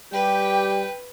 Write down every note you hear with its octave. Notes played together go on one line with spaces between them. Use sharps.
G3 G4 B4 G5